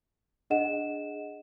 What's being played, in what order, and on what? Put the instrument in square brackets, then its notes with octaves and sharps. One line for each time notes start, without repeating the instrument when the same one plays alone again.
[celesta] D4 G#4 D#5 F#5 E7